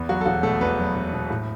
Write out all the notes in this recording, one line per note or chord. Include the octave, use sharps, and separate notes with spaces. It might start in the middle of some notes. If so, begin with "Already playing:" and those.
Already playing: E2 B3
F#3 F#4
A4
E1 F#4
B2 A3 A4
E2 B3 B4
F#3
E1
B2
A2